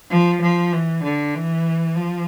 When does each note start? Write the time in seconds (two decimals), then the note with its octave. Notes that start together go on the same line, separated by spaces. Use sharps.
0.10 F3
0.41 F3
0.72 E3
1.03 D3
1.34 E3
1.96 F3